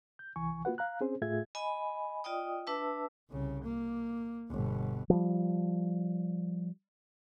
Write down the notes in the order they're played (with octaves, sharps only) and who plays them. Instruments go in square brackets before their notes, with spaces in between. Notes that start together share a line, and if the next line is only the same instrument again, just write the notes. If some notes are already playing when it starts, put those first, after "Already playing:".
[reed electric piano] G6
C2 E3 G#5 C#6
A#3 F4 F#4 B4 F#5
F5 A#5 F#6
C4 C#4 G#4 C5
A2 A3 F4 G#4 E5 G#6
[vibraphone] D#5 G#5 B5
F4 D5 D#5 G5 D#6
D4 B4 E5 A5 E6
[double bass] C2 C#3
A#3
G1 B2
[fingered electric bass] F3 G3